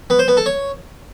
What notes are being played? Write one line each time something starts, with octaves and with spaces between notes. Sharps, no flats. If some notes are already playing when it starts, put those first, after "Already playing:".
B3
C5
B3
A4
C#5